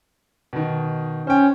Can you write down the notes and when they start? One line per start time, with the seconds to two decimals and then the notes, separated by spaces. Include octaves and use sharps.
0.53 B2 D#3
1.27 C#4 C5 G5